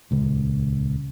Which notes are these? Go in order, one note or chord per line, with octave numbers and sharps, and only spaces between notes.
D#1 C#2